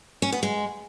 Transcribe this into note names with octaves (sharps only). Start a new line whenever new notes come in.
C#4
B3
G#3